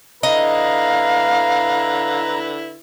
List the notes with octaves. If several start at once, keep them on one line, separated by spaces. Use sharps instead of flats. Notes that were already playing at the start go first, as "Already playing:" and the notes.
D3 E4 B4 D#5 F5 A#5